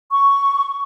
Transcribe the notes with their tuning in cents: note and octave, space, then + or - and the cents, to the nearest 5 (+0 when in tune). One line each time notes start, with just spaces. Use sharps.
C#6 +10